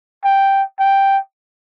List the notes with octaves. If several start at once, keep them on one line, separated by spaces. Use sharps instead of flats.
G5
G5